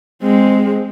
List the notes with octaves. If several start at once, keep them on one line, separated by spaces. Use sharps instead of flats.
G#3 C4